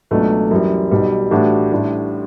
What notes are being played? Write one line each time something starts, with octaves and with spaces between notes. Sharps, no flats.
C#2 B2 F#3 A3 D4
F#2 E3 G3
B1 B2 G3
A2 E3 G3 D4 F#4
A1 A2 G3 D4